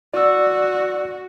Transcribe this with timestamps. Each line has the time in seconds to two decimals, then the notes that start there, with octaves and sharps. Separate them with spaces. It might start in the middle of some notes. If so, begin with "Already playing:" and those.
0.14 F#4 D5 E6